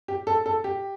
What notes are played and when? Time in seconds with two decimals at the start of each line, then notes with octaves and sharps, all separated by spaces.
0.08 G4
0.27 A4
0.46 A4
0.64 G4